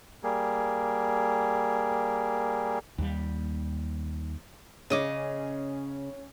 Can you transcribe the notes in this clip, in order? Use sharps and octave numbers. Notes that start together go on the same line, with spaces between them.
G3 A#3 G#4
D#2 G3
C#3 C#4 G#4 D#5 D6